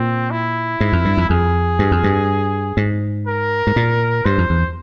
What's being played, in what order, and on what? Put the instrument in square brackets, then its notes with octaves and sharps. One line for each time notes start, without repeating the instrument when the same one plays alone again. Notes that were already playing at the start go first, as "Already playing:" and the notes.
Already playing: [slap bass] A#2 [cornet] C4
[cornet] E4
[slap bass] G#2
F2
G2
F2
[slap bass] F2 [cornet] G#4
[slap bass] G2
F2
G2
G#2
[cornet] A#4
[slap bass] G#2
A#2
[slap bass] G2 [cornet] C5
[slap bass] F2
E2